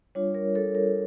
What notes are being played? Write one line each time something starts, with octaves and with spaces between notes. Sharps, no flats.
G3 D4 F4 C#5
A#4
A4
A#4